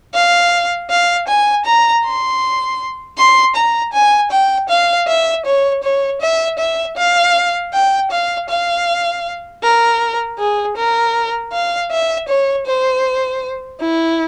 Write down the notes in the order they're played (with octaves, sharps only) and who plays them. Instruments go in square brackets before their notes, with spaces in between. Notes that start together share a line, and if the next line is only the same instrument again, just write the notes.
[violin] F5
F5
G#5
A#5
C6
C6
A#5
G#5
G5
F5
E5
C#5
C#5
E5
E5
F5
G5
F5
F5
A#4
G#4
A#4
F5
E5
C#5
C5
E4